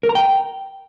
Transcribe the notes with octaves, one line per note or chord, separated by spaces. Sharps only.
A#4
A#5
G5